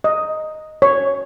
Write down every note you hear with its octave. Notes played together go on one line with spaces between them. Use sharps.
D#5
C#5